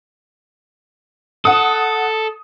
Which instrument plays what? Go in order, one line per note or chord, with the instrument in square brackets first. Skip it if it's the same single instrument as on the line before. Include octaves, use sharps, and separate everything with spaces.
[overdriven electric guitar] A4 [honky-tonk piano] F#5 D#6